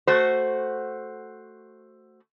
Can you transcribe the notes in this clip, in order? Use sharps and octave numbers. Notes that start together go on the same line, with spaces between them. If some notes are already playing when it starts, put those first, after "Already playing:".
A3 F#4 C5